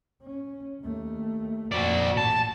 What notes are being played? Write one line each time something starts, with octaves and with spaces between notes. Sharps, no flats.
C#4
D#2 A3
F2 A#2 F#4 D5
A1 A5